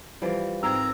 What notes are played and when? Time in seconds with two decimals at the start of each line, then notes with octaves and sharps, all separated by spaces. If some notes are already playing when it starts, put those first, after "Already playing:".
0.22 E3 F3 G3
0.63 G#2 C4 G#4 A#4 A#5 E6 G#6